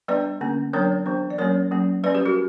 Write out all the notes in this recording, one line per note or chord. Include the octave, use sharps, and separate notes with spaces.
G3 B3 D4 B4 D5
D3 A#3 C#4
F#3 B3 D4 A#4 C#5
E3 B3 D4
D5
F#3 A#3 C#4 A#4 C#5
F#3 A#3 C#4
G3 C#4 B4 D5
G4 B4
F#4 A#4